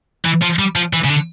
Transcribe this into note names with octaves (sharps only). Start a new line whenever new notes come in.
E3
F3
G3
F3
E3
C#3
D3